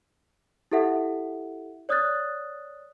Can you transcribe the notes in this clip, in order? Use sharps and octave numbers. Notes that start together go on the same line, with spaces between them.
E4 G4 A4 E5 F#5
C#5 D5 D#6 F6 F#6 A6